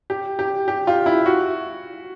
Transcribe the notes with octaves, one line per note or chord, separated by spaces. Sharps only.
G4
G4
G4
F4
E4
F#4